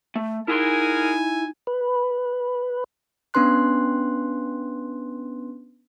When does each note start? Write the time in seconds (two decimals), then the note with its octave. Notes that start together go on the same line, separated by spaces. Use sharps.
0.16 A3
0.48 D#4 E4 F#4 G#4 A#4 G#5 C6
1.67 B4
3.34 B3 C#4 D4 B4 C6 F#6